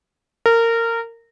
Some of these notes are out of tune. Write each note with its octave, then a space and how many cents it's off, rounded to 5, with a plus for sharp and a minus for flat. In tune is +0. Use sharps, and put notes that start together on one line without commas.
A#4 -20